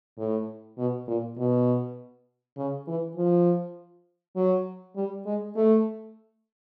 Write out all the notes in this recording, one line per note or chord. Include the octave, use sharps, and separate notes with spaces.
A2
B2
A#2
B2
C#3
E3
F3
F#3
G3
G#3
A3